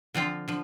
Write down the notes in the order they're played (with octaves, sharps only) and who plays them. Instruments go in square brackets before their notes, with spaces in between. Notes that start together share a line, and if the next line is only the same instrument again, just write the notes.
[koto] D3 F3 C4 F4
D3 F3